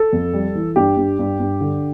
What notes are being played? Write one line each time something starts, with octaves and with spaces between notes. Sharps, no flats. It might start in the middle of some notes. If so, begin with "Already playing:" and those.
Already playing: A4
F2
G3
E3
G2 G4
G2
G2
G2
D3